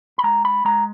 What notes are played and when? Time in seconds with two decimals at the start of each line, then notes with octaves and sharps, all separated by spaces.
0.18 B5
0.24 G#3 A#5
0.45 B5
0.65 G#3 A#5